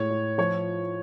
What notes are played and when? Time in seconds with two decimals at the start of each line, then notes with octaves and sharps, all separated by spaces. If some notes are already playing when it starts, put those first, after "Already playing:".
Already playing: A2 G#3 C#5
0.10 A2
0.38 F3 C#5